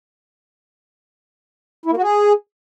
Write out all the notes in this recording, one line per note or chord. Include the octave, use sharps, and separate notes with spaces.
E4
A#3
F#4
G#4